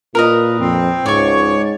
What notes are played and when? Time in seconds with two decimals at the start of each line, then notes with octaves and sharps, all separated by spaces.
0.15 A#2 F4 A#4 B4 D#5
0.60 F2 C4
1.06 C#2 G#2 C#5 D5 C#6